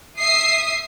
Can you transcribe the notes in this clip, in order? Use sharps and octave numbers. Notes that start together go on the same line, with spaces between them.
E5 D#6 C7